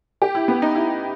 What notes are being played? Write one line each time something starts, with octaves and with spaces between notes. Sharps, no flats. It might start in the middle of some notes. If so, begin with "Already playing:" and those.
G4
E4
B3
D#4
E4